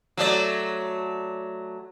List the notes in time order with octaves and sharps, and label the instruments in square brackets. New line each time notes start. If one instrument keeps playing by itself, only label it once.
[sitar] F#3 A3 D5